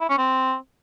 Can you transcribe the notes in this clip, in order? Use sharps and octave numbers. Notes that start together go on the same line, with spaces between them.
E4
C#4
C4